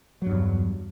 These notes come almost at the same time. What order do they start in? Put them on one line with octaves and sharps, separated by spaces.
F#3 G2 E2